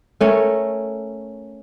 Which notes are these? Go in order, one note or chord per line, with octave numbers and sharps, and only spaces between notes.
A3 C#4 A#4